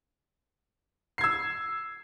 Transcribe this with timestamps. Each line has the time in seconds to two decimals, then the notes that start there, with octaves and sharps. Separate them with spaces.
1.18 C7
1.21 G#6
1.24 E6